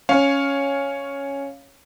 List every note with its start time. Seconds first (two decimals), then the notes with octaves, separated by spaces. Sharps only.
0.09 C#4 C#5 F5